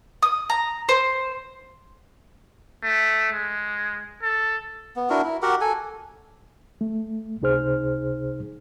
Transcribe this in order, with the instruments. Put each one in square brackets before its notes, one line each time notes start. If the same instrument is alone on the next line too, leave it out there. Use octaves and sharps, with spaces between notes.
[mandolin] D#6
A#5
C5
[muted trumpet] A3
G#3
A4
[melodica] B3
D4 E4 F#4 A#4
E4
F#4 G4 A#4 F#5
A4 G#5
[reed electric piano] A3
C#2 C3 D#4 G#4 C5 F6